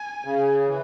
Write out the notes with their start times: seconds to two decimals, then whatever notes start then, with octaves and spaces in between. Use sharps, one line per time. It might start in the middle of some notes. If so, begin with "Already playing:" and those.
Already playing: G#5
0.25 C#3
0.66 E3